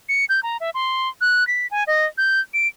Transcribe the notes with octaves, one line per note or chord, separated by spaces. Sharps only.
C#7
G6
A#5
E5
C6
F#6
B6
G#5
D#5
G6
D7